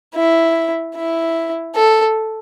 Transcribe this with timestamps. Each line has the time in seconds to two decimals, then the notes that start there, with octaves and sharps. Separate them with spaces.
0.15 E4
0.96 E4
1.75 A4